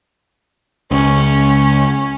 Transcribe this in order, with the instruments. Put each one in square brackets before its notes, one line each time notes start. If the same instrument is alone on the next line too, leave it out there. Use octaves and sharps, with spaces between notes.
[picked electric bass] C#2 [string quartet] C#4